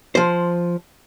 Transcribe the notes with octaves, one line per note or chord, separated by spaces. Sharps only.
F3 C5